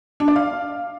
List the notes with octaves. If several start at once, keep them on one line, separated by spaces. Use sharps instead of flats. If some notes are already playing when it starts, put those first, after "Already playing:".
D4
D5
F5